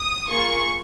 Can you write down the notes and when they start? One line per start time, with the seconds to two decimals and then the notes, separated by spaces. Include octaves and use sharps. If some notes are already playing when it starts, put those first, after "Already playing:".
Already playing: D#6
0.29 A#3 F4 G#4 C#6